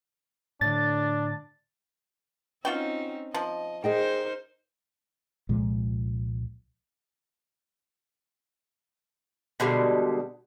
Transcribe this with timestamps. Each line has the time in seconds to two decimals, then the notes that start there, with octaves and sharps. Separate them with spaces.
0.61 A2 D3 D4 A6
2.65 C4 C#4 D#4 F4 F#4 G5
3.34 F3 D#5
3.84 D#4 G#4 A#4 C5 D#5 G5
5.49 C2 A#2 F3 G#3
9.60 B2 D3 G3 G#3